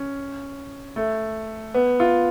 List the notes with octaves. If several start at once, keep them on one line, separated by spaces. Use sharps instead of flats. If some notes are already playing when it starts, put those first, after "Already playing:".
Already playing: C#4
A3
B3
F4